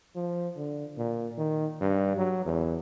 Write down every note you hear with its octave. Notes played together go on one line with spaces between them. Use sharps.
F3
D3
A#2
D#3
G2
F#3
E2